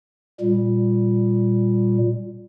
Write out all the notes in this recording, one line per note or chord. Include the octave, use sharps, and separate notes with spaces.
A#2 G3